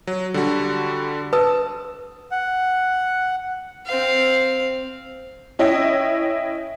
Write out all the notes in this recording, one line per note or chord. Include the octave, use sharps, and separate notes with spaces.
F#3
D3 G3 F#4
B4 A5 D#6 E6
F#5
C4 F5
C#4 E4 C#5 D#5 E5 G5